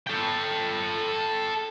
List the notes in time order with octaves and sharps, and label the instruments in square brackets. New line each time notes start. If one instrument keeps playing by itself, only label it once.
[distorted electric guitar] A4 G5